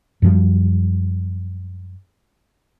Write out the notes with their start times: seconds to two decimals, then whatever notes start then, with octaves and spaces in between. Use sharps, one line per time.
0.22 F#2 F3 G3